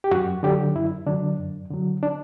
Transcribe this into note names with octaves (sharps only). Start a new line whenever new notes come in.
G4
F#2 F#4
D3 F#3 G4
F#2 E4
D3 F#3 D4
F#2
D3 F#3
D4